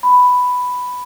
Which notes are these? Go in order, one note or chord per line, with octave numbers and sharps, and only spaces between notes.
B5